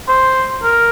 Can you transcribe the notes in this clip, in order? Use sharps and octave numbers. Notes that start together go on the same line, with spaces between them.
C5
A#4